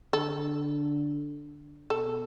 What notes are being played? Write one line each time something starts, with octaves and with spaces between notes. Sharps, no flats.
D3 A4
B2 A4